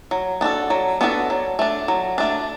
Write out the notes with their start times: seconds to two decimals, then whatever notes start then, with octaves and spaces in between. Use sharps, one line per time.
0.11 F#3
0.41 B3 D4 F#4 A4
0.70 F#3
1.01 B3 D4 F#4 A4
1.30 F#3
1.59 A3 D4
1.88 F#3
2.18 A3 D4